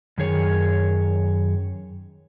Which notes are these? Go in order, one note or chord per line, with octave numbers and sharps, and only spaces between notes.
F#2 D#3 G#4 C#5